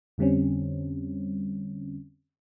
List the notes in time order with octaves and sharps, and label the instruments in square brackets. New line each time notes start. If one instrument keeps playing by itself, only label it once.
[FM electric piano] F2 D3 G3 C4 C#4